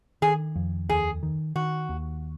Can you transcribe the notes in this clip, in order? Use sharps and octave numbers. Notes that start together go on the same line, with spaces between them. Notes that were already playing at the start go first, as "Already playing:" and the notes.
D#3 G#4
F2
D#2 G#4
D#3
D#3 F#4
D#2